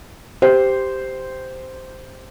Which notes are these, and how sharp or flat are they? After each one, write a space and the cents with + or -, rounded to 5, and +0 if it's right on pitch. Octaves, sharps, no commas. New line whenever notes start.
G4 +0 C5 -10